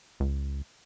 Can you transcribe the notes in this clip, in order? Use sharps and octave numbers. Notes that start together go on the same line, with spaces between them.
C#2